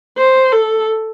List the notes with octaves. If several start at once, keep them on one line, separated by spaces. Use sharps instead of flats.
C5
A4